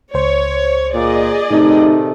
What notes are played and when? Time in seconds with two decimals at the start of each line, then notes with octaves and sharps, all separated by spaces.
0.14 C#2 C5 C#5
0.93 A#2 G#4 D5 D#5
1.51 A2 C3 D#3 A3 D#4